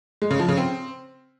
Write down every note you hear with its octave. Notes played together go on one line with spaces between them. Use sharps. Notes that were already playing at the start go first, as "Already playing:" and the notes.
G#3
C#3
F3
C#3
C4